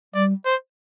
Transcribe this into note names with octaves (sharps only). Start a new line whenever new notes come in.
G3 D5
C5